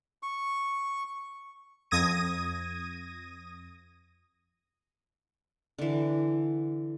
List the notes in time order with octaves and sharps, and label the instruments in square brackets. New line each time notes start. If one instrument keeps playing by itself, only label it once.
[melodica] C#6
[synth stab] F2 D#6 G#6 A#6 D#7
[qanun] D3 E3